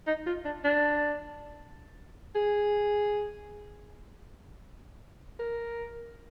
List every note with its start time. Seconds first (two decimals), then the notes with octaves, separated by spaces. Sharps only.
0.07 D#4
0.26 F4
0.45 D4
0.64 D4
2.35 G#4
5.39 A#4